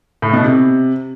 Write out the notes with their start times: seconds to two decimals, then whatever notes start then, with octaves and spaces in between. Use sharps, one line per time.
0.22 A2
0.33 B2
0.44 C3